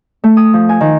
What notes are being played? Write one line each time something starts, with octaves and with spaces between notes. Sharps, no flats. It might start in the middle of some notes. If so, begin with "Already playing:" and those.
A3
D#6
F3
G#5
D#3